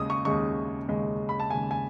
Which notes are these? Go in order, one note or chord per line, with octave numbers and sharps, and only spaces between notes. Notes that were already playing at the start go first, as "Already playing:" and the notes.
Already playing: D#2 C#3 G#3 D#6
C#6
D#2 C#3 G#3 C#6
D#2 C#3 G#3
B5
A5
D#2 C#3 G#3 G#5
G#5